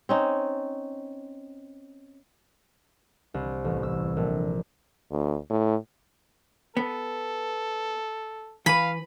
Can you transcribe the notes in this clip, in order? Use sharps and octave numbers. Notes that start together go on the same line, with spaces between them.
C4 C#4 D#4
C2
A1
E6
A#1
D2
A2
B3 A4
E3 B4 F5 B5